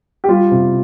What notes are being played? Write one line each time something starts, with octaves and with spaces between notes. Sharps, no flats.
G4
G3 F4
C3